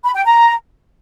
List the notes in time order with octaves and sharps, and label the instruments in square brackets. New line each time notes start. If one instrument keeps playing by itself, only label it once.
[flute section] B5
G5
A#5